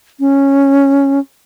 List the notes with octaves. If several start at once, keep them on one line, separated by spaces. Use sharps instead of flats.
C#4